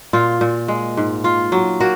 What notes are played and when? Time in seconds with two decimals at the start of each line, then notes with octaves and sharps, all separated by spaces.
0.13 A#2 F4
0.41 A#2
0.68 G#3
0.97 G#2
1.24 F4
1.52 F#3
1.80 A#3 F#4